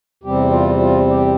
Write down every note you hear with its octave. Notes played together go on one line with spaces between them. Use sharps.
E2 C3 G3 C4 G4
F4
F4
G4